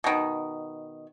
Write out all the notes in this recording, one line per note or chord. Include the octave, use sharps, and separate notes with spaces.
B2 D#3